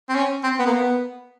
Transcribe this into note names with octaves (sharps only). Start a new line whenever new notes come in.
C4
C#4
C4
B3
A#3
B3